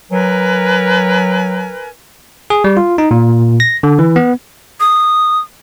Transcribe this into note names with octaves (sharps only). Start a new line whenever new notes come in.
F#3 A#4 B4 G#5
G#4
G3
F4
D#4
A#2
A#6
D3
E3
B3
D#6